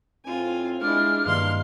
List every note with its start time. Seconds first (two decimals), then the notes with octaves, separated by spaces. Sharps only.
0.25 A2 C4 F4 G#5
0.81 G#3 D4 E4 F6
1.25 G2 D#3 A#3 D4 F5 C6